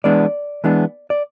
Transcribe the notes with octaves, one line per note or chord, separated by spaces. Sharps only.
E3 G#3 B3 D4 D5
E3 G#3 B3 D4
D5